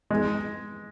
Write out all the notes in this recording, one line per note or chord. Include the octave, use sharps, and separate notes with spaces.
G#3